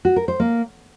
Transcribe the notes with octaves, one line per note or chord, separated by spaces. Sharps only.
F#4
A#4
C5
A#3